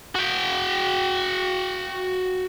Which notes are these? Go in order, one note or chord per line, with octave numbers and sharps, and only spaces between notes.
F#4 G5